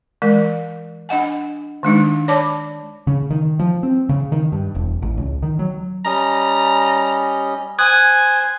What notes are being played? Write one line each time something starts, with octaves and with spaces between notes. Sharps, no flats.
E3 G#3 A#4
D4 D#5 F#5 G#5
D#3 G#3 D4 D#4
C#5 D5 A5 B5 D6
C#3
D#3
F3
C4
C#3
D#3
G2
E1
A1
C#2
D#3
F#3
G3 C#4 D#5 A#5
C5 G#5 D#6 F#6 G#6